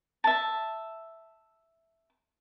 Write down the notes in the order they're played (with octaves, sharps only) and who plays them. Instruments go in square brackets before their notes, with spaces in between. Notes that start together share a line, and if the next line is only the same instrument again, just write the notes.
[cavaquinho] E5 A5